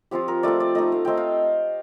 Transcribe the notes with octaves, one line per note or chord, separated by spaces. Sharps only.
F3 C4 F4 G4
A#4
A3 C4 F4 D5
D5
A3 D#4 D#5
F5
A3 C4 D#4 G5
F5